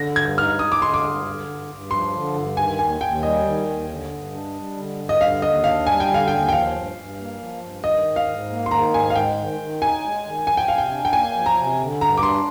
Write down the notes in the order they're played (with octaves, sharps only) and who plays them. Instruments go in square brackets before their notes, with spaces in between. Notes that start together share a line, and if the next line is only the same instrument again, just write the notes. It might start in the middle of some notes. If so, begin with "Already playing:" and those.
Already playing: [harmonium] D3 [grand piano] A#6
[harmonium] G2 [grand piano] G#6
[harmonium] D#4 [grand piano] F6
[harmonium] G#3 [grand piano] D#6
[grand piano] D6
[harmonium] D3 [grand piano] C6
[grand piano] D6
[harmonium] G2
D3
G2
G2
[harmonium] F3 [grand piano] C6
[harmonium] D3
G2
[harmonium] D#3 [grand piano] G#5
[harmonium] D#2 [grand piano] G#5
[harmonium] D#2 [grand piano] G5
[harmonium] G3 [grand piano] D#5
[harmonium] D#3
D#2
D3
G2
D4
G3
D3
G2
[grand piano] D#5
[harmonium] D3 [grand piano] F5
[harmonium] D#2 [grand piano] D#5
[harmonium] D4 [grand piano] F5
[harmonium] G3 [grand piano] G#5
[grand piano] G5
[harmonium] D3
[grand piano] F5
[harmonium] D#2 [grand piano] G5
[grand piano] G5
[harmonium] F3 [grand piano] F5
[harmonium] G2
G2
A#3
F3
G2
[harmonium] D#3 [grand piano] D#5
[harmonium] G#2
[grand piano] F5
[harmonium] G#2
A#3
[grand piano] C6
[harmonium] D#3 [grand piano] A#5
[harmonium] G#2 [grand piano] G#5
[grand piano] F5
[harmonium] G#3 [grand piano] G5
[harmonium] D#3
D#3
[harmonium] D#4 [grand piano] G#5
[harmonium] G#3
D#3
[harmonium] F3 [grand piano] G#5
[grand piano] G5
[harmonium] C3 [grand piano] F5
[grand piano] G5
[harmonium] D4
[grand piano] G5
[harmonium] A#3 [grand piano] G#5
[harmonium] F3
[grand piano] A#5
[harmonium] C3
D3
[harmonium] G2 [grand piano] A#5
[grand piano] D6
[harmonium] D4 [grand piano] C6